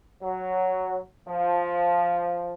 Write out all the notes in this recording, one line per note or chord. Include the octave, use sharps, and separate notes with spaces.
F#3
F3